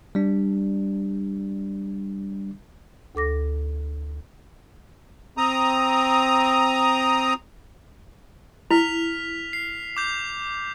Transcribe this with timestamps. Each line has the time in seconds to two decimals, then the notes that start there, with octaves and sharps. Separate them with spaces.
0.15 G3 D4
3.15 D2 A4 D6 A#6
5.37 C4 A#5 D#6
8.71 E4 F6 B6 F7
9.53 C7
9.97 D6 G6 F7